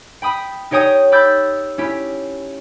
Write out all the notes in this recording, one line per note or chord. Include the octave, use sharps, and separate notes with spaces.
G5 B5 D#6
D#4 G4 C#5 G5 D#6
B5 D6 E6 G6 A6
C#4 E4 G4